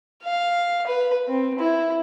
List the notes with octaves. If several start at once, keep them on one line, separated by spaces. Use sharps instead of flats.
F5
B4
C4
E4